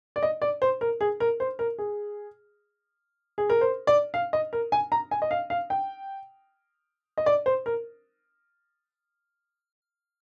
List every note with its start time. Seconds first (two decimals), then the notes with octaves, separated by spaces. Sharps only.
0.16 D5
0.23 D#5
0.42 D5
0.62 C5
0.81 A#4
1.01 G#4
1.20 A#4
1.40 C5
1.59 A#4
1.78 G#4
3.38 G#4
3.50 A#4
3.61 C5
3.87 D5
4.14 F5
4.33 D#5
4.53 A#4
4.72 G#5
4.92 A#5
5.11 G#5
5.22 D#5
5.31 F5
5.50 F5
5.70 G5
7.18 D#5
7.26 D5
7.46 C5
7.66 A#4